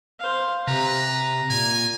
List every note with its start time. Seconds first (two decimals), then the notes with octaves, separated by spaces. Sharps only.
0.20 C5 F5
0.68 C3 B4 A#5
1.50 A#2 G#5